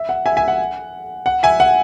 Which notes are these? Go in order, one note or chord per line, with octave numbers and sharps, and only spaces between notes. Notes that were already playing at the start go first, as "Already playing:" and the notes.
Already playing: E5
F#5
E5 G#5
E5 G#5
F#5
F#5
E5 G#5
F#5